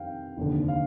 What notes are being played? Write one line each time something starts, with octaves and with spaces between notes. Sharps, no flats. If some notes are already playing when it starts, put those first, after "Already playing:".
Already playing: F2 D#3 G3 C4 F5 G5
F1 D#2 D3
F5